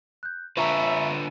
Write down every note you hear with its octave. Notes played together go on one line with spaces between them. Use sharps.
F#6 G6
D3 F4 B4 E5 A5 A#5 C#6